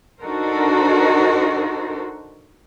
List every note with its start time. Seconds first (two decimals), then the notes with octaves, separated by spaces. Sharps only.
0.21 D4 D#4 F#4 A4 A#4 C5